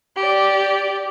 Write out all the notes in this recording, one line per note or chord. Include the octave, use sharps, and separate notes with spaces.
G4 D5